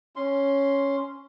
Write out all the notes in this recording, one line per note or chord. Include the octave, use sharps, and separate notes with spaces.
C#4 C6